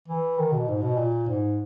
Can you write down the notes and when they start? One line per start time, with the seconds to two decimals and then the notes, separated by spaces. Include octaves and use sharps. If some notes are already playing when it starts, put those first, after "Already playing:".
0.08 E3
0.38 D#3
0.52 B2
0.68 G#2
0.82 B2
0.97 A#2
1.27 G#2